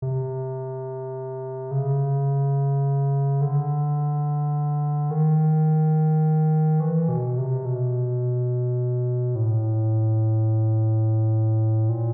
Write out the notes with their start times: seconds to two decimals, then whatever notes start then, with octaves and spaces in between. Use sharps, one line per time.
0.02 C3
1.71 C#3
3.41 D3
5.11 D#3
6.80 E3
7.09 B2
7.38 C3
7.65 B2
9.35 A2
11.89 A#2